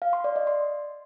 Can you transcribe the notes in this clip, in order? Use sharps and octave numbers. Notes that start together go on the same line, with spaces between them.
F5
C6
D5
D#5
C6